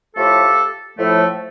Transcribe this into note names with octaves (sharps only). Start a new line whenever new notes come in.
A2 F3 A3 G4 A4
A2 F3 A3